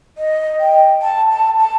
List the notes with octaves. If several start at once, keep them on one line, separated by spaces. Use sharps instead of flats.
D#5
G5
A5
A5
A5